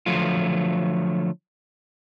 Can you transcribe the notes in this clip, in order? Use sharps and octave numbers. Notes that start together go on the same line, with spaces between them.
D3 F3 F#3 A3 F4